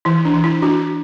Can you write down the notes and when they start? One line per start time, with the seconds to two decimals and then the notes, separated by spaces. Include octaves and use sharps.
0.05 E3 E4
0.25 D4
0.34 E3
0.44 E4
0.62 D4 F#4